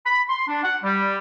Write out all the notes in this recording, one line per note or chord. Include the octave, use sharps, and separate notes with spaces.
B5
C6
D4
F#5
G3